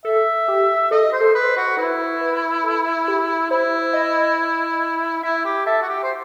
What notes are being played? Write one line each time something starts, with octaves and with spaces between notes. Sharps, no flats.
A4 E5
G4
A4 D#5
C5
A4
B4
C5
F#4
E4 B4
B4
A4
G4
E4 C5
D#5
E4 E5
G4
A4 E5
F#4
G4
C5